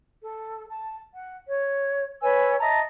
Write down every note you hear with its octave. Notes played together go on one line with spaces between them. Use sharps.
A4
A5
F#5
C#5
B4 C#5 G#5 E6
D#5 E5 A5 A#5